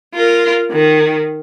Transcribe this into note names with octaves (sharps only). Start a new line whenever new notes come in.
F4 A#4
D#3